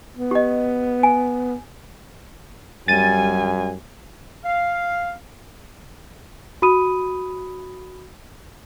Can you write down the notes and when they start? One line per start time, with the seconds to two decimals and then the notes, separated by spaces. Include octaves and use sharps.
0.17 B3
0.31 G4 D#5
1.03 G#5
2.88 F#2 G3 G#5 A6 D#7
4.45 F5
6.62 F#4 B5 D#6 D#7